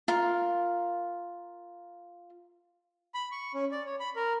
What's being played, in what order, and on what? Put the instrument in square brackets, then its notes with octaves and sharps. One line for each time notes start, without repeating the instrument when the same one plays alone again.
[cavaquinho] F4 A#4
[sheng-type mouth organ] B5
C#6
C#4
D5
C#5
B5
A#4